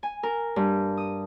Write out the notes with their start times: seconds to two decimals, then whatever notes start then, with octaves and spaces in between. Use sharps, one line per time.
0.03 G#5
0.23 A#4
0.56 G2
0.97 D#6